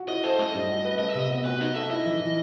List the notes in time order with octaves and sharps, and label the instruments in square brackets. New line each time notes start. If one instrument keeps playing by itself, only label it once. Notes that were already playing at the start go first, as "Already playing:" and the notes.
Already playing: [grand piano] F#4
[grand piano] E4 [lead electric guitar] D#5
[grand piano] A4 [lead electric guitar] C5
[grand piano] A3 [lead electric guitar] D#5
[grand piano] G2
F#4
B4
[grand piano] A3 [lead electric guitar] D#5
[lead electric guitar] E5
[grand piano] C3 [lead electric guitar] D#5
[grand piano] B3
[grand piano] F#4 [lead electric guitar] B4
[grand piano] D#4 [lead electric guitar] D#5
[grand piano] A4 [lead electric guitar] E5
[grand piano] E4 [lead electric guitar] D#5
[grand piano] E3
E3